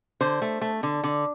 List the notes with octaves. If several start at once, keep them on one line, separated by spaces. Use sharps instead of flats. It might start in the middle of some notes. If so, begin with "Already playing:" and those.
D3 C5
A3
A3
D3
D3